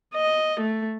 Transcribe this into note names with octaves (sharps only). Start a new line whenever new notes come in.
D#5
A3